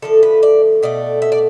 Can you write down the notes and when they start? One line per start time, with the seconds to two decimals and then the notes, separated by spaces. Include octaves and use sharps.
0.02 D3 F3 A3 A4
0.23 B4
0.43 D5
0.83 B2 A3 D5
1.22 E5
1.32 D5